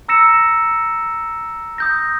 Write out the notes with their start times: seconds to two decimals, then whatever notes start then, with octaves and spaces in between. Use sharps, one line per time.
0.08 A#5 E6 A#6 C#7 E7
1.78 D#6 G6 A#6